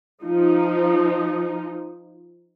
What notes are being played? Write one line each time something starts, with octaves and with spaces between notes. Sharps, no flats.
F3 D#4